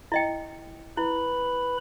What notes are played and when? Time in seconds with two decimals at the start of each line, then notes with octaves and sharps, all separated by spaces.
0.12 E4 D#5 G5
0.97 E4 B4 B5